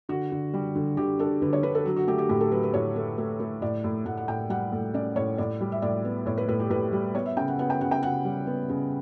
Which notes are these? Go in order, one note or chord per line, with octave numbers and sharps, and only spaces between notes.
D3 F#4
D3
G3
D3
D3 G4
D4 A4
D3 B4
C#5
D3 B4
A4
F#3
F#4
A3 G4
G4
A2 G4
A4
F#3 B4
B4
A2 C#5
A3
A3
A3
A2 D5
A2
A2 F#5
F#5
A2 G5
G3 F#5
A2
C#4 D5
A2 C#5
A2 D5
G3
E5
A2 D5
B3
A2 C#5
B4
A2 B4
G4
A2 B4
G3
B3 C#5
E5
C#3 G5
F#5
B3 F#5
G5
C#3 F#5
G5
C#3 F#5
G3
B3
C#3